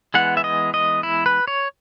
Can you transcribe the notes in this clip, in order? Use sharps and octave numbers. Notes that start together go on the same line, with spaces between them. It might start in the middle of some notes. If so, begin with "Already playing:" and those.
E3 G#3 B3 F#5
E5
D#5
D#5
E4
B4
C#5